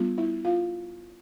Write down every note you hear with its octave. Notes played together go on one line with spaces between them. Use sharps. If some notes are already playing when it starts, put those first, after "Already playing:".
Already playing: G3 B3 D4 F4
E4 E5
F4 F5